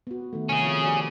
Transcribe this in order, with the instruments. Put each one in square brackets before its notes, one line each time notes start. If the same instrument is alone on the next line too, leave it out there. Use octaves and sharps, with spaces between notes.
[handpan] B3 F#4
D#3 A3
[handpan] C3 [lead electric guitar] C#4 G#4
[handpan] F3
F#4 D5